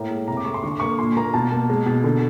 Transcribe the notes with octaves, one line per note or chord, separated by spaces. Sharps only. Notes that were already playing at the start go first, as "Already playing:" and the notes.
Already playing: A2 A#3 A#5
G#3
C3 A#5
D6
A3 C#6
C6
D3 C#6
D6
A#3 C#6
A#2 C6
A#3 A#5
B2 A5
A#3
G#3
B2
D3